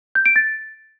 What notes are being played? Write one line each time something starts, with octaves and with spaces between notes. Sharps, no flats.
G6
D7
A6